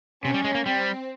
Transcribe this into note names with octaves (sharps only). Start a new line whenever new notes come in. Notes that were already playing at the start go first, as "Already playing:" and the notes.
C3 C#4
G3
G#3
A#3
G3 C4